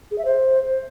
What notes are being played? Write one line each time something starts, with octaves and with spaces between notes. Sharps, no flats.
G#4
E5
C5